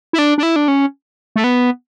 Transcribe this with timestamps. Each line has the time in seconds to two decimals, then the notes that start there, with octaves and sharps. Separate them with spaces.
0.13 E4
0.18 D4
0.38 D4
0.43 E4
0.56 D4
0.68 C#4
1.36 A3
1.44 B3